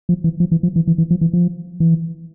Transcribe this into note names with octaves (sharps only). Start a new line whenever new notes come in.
F3
E3
F3
E3
F3
E3
E3
E3
F3
E3
F3
E3